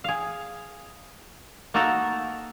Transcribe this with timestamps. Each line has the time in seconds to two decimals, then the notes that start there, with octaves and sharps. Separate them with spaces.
0.04 G#4 F5
1.74 A#3 D#4 F#4 A4 A#4 F#5